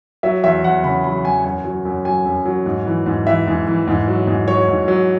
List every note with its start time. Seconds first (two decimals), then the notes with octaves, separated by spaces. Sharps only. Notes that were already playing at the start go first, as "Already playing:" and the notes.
0.23 F#3 E5
0.44 E2 E5
0.64 E2 F#5
0.83 C#3 B5
1.04 F#3 B5
1.24 E2 G#5
1.44 F#2 G#5
1.65 F#3
1.85 F#2
2.05 F#3 G#5
2.25 F#2
2.45 F#3
2.66 G#2
2.86 E3
3.06 G#2
3.27 E3 E5
3.47 G#2
3.67 E3
3.87 G#2
4.08 F#3
4.27 G#2
4.48 F#3 C#5
4.68 G#2
4.88 F#3